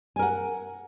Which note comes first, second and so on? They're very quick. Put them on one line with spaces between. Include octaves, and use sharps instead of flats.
G#5 A#4 F#5